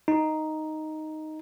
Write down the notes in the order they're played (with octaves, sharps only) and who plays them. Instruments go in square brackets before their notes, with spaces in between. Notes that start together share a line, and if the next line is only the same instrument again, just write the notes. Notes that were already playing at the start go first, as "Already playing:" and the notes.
[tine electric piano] D#4